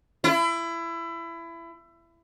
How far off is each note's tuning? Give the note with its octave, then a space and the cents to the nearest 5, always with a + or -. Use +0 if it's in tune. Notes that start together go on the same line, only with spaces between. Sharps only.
E4 +25